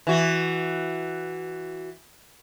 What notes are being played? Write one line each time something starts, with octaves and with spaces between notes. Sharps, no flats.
E3 F#4